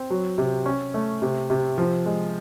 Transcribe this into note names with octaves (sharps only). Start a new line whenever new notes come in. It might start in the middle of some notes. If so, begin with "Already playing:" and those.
Already playing: C4
F#3
C3
C#4
A3
C3
C3
F3
G#3